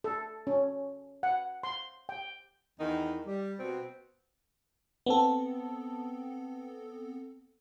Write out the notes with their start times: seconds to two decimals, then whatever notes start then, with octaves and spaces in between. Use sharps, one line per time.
0.04 A4
0.47 C#4
1.23 F#5
1.63 C6
2.09 G5
2.80 E2 D#3 E3 D#4
3.26 G3
3.58 B2 C4 F#4
5.06 B3 C4 A4